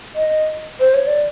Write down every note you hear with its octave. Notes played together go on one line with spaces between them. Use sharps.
D#5
C5
C#5
D5